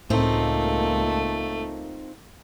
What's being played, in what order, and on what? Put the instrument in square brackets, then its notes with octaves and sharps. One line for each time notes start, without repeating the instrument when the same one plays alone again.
[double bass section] C#2 A#3 [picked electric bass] A2 [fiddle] A3 [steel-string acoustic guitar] C4 D#4 F4